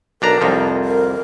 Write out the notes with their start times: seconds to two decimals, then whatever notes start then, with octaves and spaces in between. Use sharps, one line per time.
0.22 B1 D4 A#4 A#5
0.41 C2 F2 F3
0.85 A#4